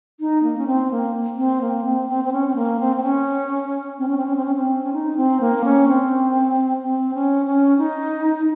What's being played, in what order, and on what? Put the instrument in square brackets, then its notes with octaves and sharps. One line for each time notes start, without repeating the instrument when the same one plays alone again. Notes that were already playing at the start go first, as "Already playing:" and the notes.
[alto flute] D#4
A#3
C#4
C4
A#3
C4
A#3
C4
C4
C4
C#4
C4
A#3
C4
C4
C#4
C4
C#4
C4
C#4
C4
C#4
C4
C#4
D#4
C4
A#3
C#4
C4
C4
C#4
C#4
D#4